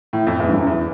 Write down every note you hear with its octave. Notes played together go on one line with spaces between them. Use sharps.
A2
F2
E2
G2
F#2
E2